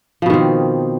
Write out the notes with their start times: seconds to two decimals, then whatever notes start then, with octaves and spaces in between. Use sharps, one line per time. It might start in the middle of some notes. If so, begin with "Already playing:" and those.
0.22 F3
0.26 B2
0.30 D#3
0.34 C4